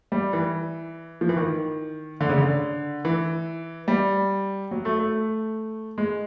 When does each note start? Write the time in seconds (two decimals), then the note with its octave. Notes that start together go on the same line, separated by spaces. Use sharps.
0.12 G3
0.33 E3
1.21 F3
1.29 E3
1.37 D#3
2.21 D3
2.29 C#3
2.38 D3
3.05 E3
3.88 G3
4.71 F#3
4.85 A3
4.99 A3
5.98 G#3